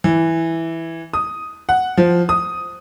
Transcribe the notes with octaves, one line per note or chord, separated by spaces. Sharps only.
E3
D#6
F#5
F3
D#6